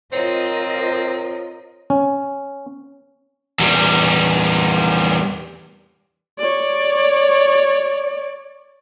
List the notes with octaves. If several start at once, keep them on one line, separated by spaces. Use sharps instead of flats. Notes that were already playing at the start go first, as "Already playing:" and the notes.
C4 F4 A#4 C#5 D#5
C#4
E2 G3
C#5 D5